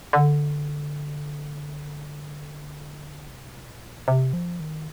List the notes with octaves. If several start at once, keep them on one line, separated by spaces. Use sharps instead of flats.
D3
C3
A#2
C3
F3
D#3